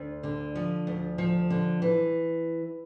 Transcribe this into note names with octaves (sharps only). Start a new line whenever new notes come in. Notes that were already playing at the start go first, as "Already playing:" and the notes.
Already playing: D2
D3
F3
D2
F3
D3
E3